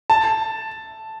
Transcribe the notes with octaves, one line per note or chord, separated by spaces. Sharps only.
A5